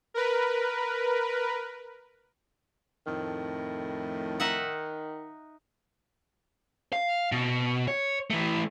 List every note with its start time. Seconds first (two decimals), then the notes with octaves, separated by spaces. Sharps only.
0.14 A#4 B4
3.06 F2 A2 D#3
4.40 D#4 E5 F#5
6.93 F5
7.32 B2
7.88 C#5
8.30 E3 A3